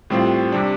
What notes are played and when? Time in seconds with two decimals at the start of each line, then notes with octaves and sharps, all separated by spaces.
0.10 A2 G3 C4 F4
0.52 C3 G3 D4